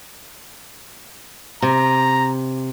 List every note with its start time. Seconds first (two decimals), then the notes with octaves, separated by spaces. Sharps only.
1.62 C3 A#5